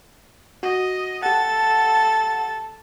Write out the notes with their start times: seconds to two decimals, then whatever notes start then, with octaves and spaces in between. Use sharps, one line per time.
0.63 F#4 D#5
1.22 G4 A4 F#5 A5 A6